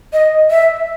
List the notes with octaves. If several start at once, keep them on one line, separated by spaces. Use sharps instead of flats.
D#5
E5